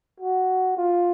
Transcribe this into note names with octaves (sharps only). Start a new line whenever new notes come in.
F#4
F4